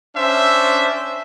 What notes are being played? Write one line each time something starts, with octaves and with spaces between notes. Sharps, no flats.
C#4 D4 C5 E5